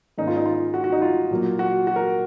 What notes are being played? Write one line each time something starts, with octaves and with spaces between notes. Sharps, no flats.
G#2 D#3 A#3 C#4 D#4
F4
D#4
F4
F#4
F#4
D#4
F4
A#2 F#3 A#3
F#4
F#4
A#4